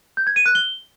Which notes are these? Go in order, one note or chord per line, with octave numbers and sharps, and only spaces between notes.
G6
G#6
D#7
F#6
G7